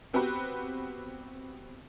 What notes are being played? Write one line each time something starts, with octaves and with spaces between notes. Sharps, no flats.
B3 C4 F#4 G4 B4